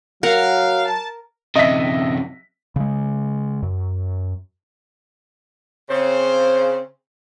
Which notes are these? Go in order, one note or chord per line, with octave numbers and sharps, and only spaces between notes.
F#3 A#4 F5 F#5
A5
F#2 C3 D#5 E5 B6
C#3 G#3
F#2
C#3 C4 C5